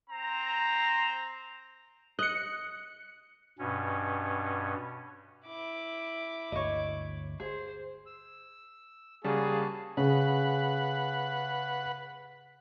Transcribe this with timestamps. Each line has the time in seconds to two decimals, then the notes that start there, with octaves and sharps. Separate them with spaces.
0.10 C4 C5 A#5
2.19 D#5 F#6 C#7
3.59 G2 B2 C#4
5.46 E4 D6
6.52 G1 D2 C#5 D#5
7.40 G#4 C5
8.06 E6
9.24 C#3 G3 A#3 F#4 G#4 A5
9.97 C#3 B4 F#5